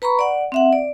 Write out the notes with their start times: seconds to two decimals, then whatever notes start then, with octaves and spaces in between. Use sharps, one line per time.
0.02 B4 A#5 B5 C#6
0.19 D5 F#5
0.52 C4 E5 F#5
0.73 D5